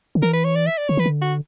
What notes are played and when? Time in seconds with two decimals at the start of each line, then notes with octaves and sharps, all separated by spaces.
0.15 D3
0.22 E3 A#4
0.33 B4
0.44 C#5
0.55 D5
0.67 E5
0.78 D5
0.89 D3 C#5
0.97 E3 B4
1.06 D3
1.22 F#4